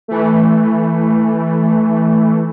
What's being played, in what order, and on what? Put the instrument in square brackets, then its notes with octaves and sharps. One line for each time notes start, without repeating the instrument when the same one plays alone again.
[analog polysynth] E3 A3